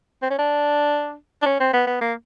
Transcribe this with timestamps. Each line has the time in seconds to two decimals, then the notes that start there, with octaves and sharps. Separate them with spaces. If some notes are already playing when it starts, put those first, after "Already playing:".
0.22 C4
0.30 C#4
0.39 D4
1.42 D4
1.46 C#4
1.60 C4
1.73 B3
1.87 B3
2.01 A#3